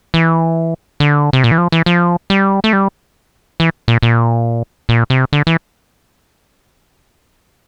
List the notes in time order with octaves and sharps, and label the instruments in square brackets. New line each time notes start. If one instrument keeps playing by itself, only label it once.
[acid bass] E3
D3
C3
A#2
E3
F3
E3
F3
G3
A3
G3
E3
A#2
A#2
A#2
C3
D3
E3